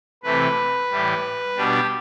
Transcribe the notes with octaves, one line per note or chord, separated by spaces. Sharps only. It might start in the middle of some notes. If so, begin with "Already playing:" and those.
C3 E3 A3 B4
A2 E3 G3
B2 G3 D4 G4